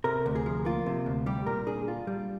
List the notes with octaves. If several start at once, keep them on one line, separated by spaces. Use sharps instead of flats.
C3 A#4
D2
G#4
F3
A#3 F4
C3
D2
G3 G4
A#2 A#4
D4 G#4
F4
G3